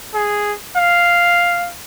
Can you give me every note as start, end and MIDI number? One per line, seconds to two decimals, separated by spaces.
0.14 0.53 68
0.76 1.69 77